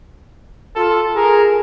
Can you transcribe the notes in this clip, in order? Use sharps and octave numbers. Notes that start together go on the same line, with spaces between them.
F4 A4
G#4 A#4